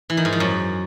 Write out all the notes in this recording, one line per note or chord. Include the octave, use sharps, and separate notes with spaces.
E3
D#3
G#2
F3
F#2